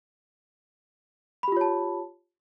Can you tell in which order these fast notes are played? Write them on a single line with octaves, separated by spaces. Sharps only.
B5 G4 F4 C#5 A5